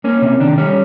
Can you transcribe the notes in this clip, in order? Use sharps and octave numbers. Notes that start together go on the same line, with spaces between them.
A#3 C#4
C3 C#4
D#3 D4
G3 C#4